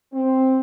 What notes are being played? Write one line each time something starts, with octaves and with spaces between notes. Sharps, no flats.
C4